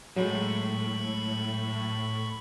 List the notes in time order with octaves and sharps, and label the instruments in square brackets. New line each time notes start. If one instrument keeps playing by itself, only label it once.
[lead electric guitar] A2 [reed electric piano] F#3 G#3 [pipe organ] B5 C#6